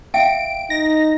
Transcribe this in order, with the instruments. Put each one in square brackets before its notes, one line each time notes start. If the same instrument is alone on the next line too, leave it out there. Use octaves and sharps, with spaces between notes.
[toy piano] E5 F5 G5 [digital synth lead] D7
[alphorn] D#4 [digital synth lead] A#6